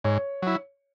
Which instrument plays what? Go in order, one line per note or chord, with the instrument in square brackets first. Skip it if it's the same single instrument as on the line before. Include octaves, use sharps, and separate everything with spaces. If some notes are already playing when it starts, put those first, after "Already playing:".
[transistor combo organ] G#2 [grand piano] C#5
[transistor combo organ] F#3 E4